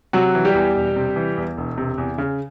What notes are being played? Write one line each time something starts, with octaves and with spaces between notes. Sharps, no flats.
C3 F#3 F#4
E3
G3 G4
E2
E1
C3
E3
E2
E1
C3
E2
C#3